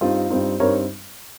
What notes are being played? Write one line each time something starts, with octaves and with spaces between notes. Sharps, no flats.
G2 G3 C4 D#4 F4
G2 G3 C4 D#4
G2 G3 C4 D#4 A#4 C#5